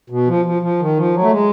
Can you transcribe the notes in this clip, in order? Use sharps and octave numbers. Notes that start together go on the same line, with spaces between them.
B2
F3
F3
F3
D#3
F3
F#3
A3
G#3